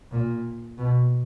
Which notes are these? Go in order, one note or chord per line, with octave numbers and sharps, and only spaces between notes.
A#2
B2